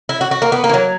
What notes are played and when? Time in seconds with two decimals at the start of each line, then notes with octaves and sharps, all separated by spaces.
0.09 E4
0.21 F#4
0.31 F#4
0.42 A#3
0.52 B3
0.64 A#3
0.69 E3
0.74 F#3